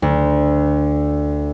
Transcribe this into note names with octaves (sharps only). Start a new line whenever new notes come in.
D2